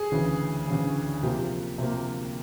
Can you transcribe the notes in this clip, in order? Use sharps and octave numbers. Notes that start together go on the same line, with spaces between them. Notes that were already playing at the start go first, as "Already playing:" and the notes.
Already playing: G#4
D2 C#3 E3
D2 C#3 E3
C3 F3 A#3 G4
C3 F3 A#3